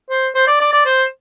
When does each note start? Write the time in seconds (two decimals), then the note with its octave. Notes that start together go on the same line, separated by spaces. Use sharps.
0.10 C5
0.35 C5
0.47 D5
0.60 D5
0.73 D5
0.86 C5